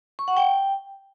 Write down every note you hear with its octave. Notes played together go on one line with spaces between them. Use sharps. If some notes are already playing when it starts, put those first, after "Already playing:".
C#6
F#5
G5